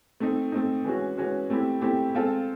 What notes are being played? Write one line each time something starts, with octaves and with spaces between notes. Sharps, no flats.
A3 C4 D#4
A3 C4 D#4
E3 G#3 C#4 F#4
E3 G#3 C#4 F#4
A3 C4 E4 G4
A3 C4 E4 G4
G#3 C4 F4 A4